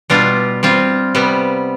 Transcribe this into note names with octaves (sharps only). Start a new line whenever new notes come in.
B2 G3 D4 F4
G3 C4 F4
C3 G3 B3